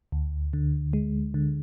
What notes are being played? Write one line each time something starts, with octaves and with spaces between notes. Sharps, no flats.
D2
D3
G#3
D3